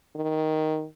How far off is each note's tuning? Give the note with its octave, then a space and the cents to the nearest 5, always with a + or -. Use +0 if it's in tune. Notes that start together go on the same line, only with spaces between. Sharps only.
D#3 +5